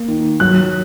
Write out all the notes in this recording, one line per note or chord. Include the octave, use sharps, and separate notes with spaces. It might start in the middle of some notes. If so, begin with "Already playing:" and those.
Already playing: A#3
D#3
F#3 F#6